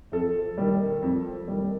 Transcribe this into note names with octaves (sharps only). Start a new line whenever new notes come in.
F2 A4
D#3 G3
F2
D#3 G3